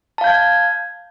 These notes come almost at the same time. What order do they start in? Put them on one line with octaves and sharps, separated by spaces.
A5 F5 G6 G#6